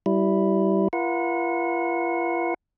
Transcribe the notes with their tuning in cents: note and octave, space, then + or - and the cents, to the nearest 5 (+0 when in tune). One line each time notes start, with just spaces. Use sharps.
G3 -20 E4 +0
F4 -40 A#4 +45 F#5 -25